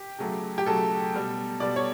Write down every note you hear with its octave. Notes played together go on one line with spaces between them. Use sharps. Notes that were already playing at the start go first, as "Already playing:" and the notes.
Already playing: G4
C#3 F#3 A3
G4
C#3 F#3 A3 A4
B2 G3
B2 G3 D5
C#5